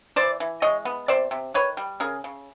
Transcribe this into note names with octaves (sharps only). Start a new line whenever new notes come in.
E3 C5 D5
E3
G#3 C#5 D#5
B3
C3 C5 D5
C3
D#3 B4 C#5
G3
C#3 G#4 A#4
C#3